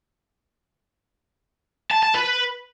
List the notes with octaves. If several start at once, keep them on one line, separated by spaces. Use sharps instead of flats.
A5
A5
B4